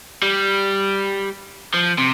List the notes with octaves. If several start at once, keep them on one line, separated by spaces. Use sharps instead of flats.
G3
F3
C3